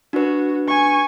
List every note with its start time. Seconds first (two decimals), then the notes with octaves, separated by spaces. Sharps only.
0.13 D4 F#4 B4
0.68 G#5 C#6